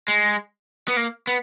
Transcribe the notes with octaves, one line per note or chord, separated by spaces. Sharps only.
G#3
B3
A#3
B3